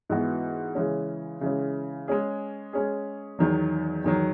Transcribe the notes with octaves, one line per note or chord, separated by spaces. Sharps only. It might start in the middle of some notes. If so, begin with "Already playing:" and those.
G#2 E3 B3 F#4
C#3 E3 G#3 C#4
C#3 E3 G#3 C#4
G#3 C#4 G#4
G#3 C#4 G#4
E2 D#3 F#3
E2 D#3 F#3